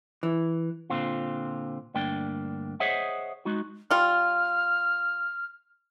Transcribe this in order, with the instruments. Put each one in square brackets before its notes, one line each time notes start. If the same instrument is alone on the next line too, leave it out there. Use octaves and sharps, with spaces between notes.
[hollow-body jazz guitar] E3
[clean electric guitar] A#2 D3 C4 F4
D2 G2 A#3 D4 G5
G#4 C5 C#5 D#5 E5 F#5
G#3 D#4 F#4
[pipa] G3 F4 [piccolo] F6